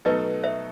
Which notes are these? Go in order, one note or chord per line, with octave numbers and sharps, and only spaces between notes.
B2 F#3 A3 D#4 A4 B4 D#5
C5 E5